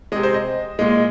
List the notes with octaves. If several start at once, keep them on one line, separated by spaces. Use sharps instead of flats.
C3 G#3 D#5
C5
D#5
A#2 G#3